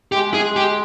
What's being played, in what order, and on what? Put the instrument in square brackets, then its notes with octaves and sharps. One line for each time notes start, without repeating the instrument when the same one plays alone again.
[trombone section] G#3 [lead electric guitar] G4
[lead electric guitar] G#4
G4